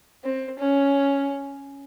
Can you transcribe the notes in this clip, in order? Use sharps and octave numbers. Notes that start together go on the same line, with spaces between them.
C4
C#4